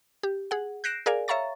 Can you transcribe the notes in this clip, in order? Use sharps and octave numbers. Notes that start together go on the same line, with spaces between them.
G4
G#4 F#5
F#6 G6 A#6 C7 D7 E7
G#4 A#4 D5 F5 G#5
C#5 E5 F5 A#5 C#6 A6